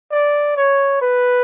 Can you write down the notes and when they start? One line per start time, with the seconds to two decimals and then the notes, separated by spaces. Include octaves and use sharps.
0.12 D5
0.57 C#5
1.02 B4